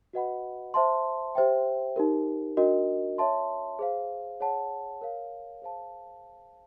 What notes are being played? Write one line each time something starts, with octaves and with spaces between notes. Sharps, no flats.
F#4 B4 D#5 F#5 B5
C5 E5 A5 C6
G4 C5 E5 G5
D#4 G4 A#4
D4 F#4 A#4 D#5
C#5 E5 A5 C6
G#4 C5 F5
G#4 C#5 F#5 A5
A#4 C#5 F5
G#4 C5 F5 A5